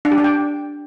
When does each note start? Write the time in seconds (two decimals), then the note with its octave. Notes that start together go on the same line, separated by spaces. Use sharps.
0.05 D4
0.11 G4
0.18 D4
0.24 G5